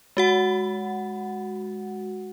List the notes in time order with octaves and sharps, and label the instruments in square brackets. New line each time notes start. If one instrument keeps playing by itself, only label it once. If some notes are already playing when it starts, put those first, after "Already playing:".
[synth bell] G#3 F#4 F#5